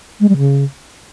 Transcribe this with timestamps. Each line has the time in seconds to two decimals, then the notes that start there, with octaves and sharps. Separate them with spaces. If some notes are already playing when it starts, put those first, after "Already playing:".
0.20 G#3
0.29 G3
0.37 C#3